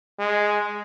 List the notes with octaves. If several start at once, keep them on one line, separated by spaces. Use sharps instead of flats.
G#3